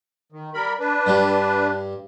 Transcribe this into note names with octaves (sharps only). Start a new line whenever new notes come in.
D#3
G3 A#4 B5
D4 B4
G2 G3